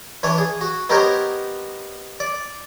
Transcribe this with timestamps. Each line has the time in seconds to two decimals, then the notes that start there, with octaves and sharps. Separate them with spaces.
0.23 E3 D4 C#5
0.38 G#4
0.61 F#4
0.90 B3 D#4 G4 A#4 C5 C#5
2.20 D5